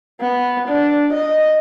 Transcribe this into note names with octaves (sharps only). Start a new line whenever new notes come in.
B3
D4
D#5